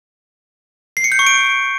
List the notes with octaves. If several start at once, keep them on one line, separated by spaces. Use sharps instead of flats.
C7
C#7
G6
C#6
D7